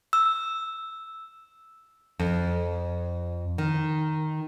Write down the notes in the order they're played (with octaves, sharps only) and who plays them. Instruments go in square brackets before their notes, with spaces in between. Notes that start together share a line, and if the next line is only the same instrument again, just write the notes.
[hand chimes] E6
[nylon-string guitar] F2
D#3